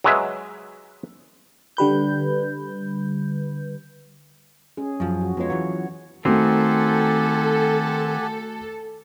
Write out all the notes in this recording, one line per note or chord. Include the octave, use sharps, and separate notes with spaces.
F#3 G#3 B4 E5
D3 G3 B4 G6
C#4 G#4
F#2 F3
F#4
F2 G#3 B3 F4 C#5
E3 F#3
D#3 A3 C4 F#4 G4 A4 F#5 G#5